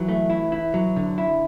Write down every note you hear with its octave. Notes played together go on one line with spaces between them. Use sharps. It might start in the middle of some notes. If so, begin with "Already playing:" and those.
Already playing: E3 F#3
A3
E4
E4
F#3
D3
E4